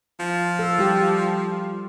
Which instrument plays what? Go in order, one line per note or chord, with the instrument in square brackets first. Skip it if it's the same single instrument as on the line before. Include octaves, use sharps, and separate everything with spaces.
[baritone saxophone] F3
[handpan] A4
G3 F4 G4